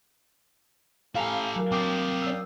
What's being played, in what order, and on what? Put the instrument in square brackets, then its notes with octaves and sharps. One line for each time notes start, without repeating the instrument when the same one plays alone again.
[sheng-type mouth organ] A3 G4 F6 [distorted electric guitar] E4 A#5 [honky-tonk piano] F5 G#5
[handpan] F#3 A#4
[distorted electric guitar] C4 D4 [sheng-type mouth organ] F5 G5 D#6 [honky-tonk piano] D6
[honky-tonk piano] D5 E6